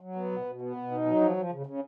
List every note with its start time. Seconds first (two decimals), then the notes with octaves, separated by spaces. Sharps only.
0.01 F#3
0.16 B3
0.32 B2
0.46 B2
0.61 B3
0.76 B2
0.91 D#4
1.06 F#3
1.21 F3
1.37 F3
1.52 C#3
1.66 C#3